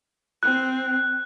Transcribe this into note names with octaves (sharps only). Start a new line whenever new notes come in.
C4 F#6